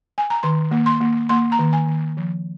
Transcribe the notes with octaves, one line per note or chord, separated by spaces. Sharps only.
G#5
A#5
D#3 C6
A#3
C6
A#3
A#3 C6
A#5
D#3
G#5
D#3
F3